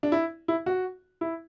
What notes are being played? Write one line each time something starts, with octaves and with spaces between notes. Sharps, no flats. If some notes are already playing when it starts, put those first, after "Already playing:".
D4
E4
E4
F#4
E4